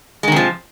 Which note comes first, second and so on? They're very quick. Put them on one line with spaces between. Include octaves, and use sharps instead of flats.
G#3 D#3 C3 F3